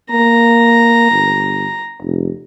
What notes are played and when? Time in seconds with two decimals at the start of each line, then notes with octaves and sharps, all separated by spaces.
0.11 A#3 A#5
1.11 G1
2.02 F1